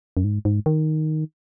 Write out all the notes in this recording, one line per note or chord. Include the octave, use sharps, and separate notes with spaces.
F#2
G#2
G#2
D#3